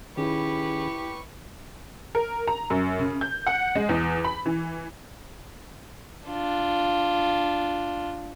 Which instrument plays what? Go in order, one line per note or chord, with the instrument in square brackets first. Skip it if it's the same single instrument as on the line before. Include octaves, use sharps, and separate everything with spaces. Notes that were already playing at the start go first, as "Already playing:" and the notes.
[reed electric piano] D#3 C#4 G#4 [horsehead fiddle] E4 [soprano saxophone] G4 [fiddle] B4 C#6
[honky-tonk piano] A#4
A#5
F#2
C#3
G6
F#5
G#3
E2
B5
E3
[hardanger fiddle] D4 F4